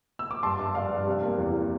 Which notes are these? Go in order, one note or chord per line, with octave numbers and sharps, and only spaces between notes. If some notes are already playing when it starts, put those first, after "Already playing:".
E6
D6
G2 A5 C6
G2
G2 D5 F5
G2
C3
A#3
E2